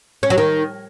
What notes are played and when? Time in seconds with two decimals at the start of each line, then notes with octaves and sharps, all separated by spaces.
0.23 C#4
0.30 F#3
0.38 D#3